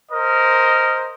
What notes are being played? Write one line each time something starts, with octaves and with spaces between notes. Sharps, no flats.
A#4 C5 D#5